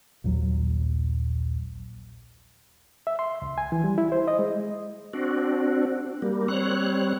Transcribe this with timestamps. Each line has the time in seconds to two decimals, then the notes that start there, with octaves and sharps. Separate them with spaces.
0.24 A#1 D#2 F#3
3.07 E5
3.19 C6
3.42 C#2
3.58 G#5
3.72 E3
3.84 G3
3.98 E4
4.12 C5
4.28 D#5
4.39 G#3
5.13 C4 D4 F#4
6.22 G3 A#3
6.48 G3 C4 C#5 F#6